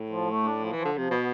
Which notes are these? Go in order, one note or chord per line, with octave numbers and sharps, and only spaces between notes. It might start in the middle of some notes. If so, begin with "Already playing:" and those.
Already playing: A2
F3
A3
D4
F3
E3 F3
D3
C3 F3
B2 B3